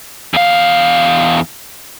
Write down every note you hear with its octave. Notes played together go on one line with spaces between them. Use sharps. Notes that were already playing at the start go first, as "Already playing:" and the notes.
E2 F5